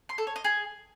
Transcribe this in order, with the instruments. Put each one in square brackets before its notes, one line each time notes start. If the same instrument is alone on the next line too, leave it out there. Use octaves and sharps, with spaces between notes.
[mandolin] C6
A4
C#5
D#5
G#4